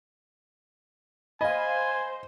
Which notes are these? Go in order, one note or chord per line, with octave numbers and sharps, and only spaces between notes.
C5 D#5 F5 G#5 B5